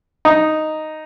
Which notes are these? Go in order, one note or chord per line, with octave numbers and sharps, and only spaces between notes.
D#4